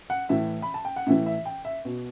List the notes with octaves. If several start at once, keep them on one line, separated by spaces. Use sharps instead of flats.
F#5
A2 E3 E5
B5
A5
G5
F#5
A2 E3 E5
E5
G5
E5
B2